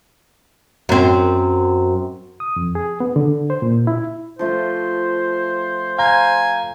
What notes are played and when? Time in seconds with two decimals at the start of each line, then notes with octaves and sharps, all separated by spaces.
0.89 F#2 C4
2.40 D#6
2.56 F2
2.75 G#4
3.00 B3
3.16 D3
3.50 C5
3.62 A#2
3.87 E4
4.39 F3 A3 F4 C5
5.98 F5 G#5 A#5